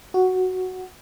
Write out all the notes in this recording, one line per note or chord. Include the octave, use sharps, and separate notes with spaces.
F#4